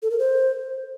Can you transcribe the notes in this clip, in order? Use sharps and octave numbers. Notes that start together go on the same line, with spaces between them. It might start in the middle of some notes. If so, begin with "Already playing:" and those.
A4
A#4
C5